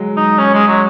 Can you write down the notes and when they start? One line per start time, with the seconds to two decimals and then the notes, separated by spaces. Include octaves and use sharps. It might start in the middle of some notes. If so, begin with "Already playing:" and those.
Already playing: F#3 G#3
0.17 D#4
0.39 C#4
0.54 G#3
0.68 F#3